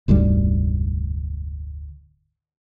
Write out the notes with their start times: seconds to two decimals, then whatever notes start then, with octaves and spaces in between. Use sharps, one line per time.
0.08 F1 D2 G#2 G3